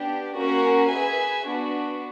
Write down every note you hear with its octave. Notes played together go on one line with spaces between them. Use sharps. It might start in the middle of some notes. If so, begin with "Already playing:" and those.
Already playing: B3 D4 G4
A#3 C#4 F#4 A#4
G#4 B4 E5 G#5
B3 D4 F#4 B4